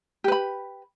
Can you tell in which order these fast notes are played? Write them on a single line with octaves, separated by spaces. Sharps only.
G4 B4 B5